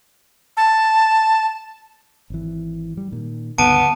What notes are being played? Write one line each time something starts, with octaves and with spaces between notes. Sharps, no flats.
A5
G#1 E3
G3
A#2 D#3
C#2 G2 D3 B3 A5 D7 D#7